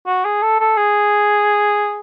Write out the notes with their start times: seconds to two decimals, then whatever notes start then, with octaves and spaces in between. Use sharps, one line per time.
0.06 F#4
0.25 G#4
0.43 A4
0.60 A4
0.77 G#4